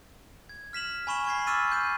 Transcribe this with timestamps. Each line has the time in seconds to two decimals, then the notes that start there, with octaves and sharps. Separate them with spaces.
0.49 G#6
0.73 F6 B6 E7 F#7
1.07 G#5 B5 C#6 E7 F#7 G7
1.27 C#6 G#6 B6 C7
1.47 C#6 D6 E6 F6 A6 D#7
1.70 C6 G6 D#7